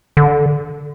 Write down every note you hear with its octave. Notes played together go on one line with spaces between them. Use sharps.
D3